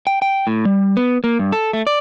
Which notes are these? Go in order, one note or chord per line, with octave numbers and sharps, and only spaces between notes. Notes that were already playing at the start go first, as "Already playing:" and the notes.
G5
G5
A2
G3
B3
A#3
G2
A4
A3
D5